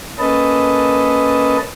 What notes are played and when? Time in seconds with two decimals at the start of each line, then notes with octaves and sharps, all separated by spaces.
0.19 A#3 C#4 A4 B4 D#5 A5